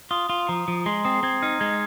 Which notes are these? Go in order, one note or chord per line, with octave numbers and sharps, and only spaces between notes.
F4 D#6
F4
F3 A#5
F3
G#3 C6
C4 D#6
C4 G#6
D#4 F6
G#3 G#6